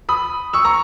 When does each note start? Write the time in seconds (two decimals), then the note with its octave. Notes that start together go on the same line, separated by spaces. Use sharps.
0.09 B5 D#6
0.53 C#6 E6
0.65 A#5 C#6